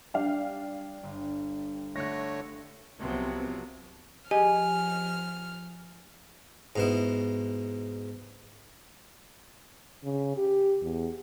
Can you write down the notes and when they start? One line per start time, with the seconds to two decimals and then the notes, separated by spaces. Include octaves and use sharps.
0.14 G3 D4 G4 F5
1.03 G1
1.96 D3 A3 C#5 F#6 A#6
2.99 C2 C3 F3 F#3 B3 C4
4.31 F3 G4 G#4 D#5 G#5 F6
6.76 G#2 B2 E4
10.04 C#3
10.37 G4
10.82 E2